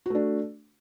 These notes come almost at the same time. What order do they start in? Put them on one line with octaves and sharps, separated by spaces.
F#4 A3 D4